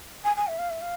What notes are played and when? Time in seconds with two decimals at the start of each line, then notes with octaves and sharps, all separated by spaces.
0.24 G#5
0.36 G#5
0.47 E5
0.58 F5
0.70 E5
0.81 F5